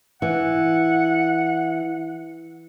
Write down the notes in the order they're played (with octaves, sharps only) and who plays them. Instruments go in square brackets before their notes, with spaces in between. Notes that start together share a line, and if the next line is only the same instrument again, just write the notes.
[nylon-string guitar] E3 [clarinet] F#5